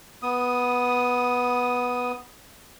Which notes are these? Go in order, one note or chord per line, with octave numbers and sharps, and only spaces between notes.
B3 D#6